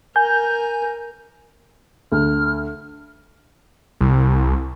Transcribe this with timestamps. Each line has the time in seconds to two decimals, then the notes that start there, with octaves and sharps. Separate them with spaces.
0.16 A#4 G#5 G6
2.12 D2 F6
4.01 C2